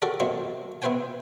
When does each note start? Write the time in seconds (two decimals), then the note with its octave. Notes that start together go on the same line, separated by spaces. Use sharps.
0.02 F#4 G4 A4 A#4 D5
0.20 F#3 A#3 C4 D#4 E4
0.82 B3 E4 B4 C5 G5 G#5